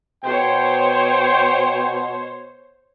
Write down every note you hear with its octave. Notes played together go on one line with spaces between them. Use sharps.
B2 C5 C#5 G5